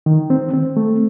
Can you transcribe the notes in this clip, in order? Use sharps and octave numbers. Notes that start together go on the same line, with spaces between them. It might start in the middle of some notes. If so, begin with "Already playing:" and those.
D#3
C4
C4
A3